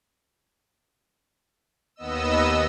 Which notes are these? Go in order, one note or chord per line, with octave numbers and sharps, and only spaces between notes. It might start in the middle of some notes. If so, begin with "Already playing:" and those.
D#2 B3 D#5 E6